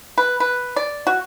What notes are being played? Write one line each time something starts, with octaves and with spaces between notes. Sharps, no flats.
B4
B4
D5
F#4